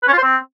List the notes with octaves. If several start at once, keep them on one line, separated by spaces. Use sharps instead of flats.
B4
C#4
F4
C5
C4